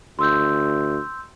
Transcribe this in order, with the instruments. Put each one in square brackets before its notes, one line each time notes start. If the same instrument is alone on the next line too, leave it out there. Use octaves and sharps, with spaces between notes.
[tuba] D2 [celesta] C6 E6 G6